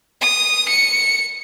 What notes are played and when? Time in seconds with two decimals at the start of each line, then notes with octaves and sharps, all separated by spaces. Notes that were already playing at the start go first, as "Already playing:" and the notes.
0.21 D#6
0.68 C#7